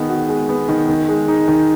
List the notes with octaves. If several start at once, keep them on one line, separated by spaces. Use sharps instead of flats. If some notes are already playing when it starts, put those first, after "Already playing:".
Already playing: D#3 G#3 B3
F#4
G#3
B3
D#3
D#3
G#3
D#4
D#3